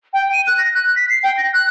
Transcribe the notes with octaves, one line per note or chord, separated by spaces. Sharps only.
G5
D#7
F#6
A#6
F#6
B6
C7
G5
A#6
F#6